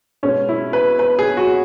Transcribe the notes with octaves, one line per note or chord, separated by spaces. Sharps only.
B2 G#3 C#4
E4
B4
B4
G#4
F#4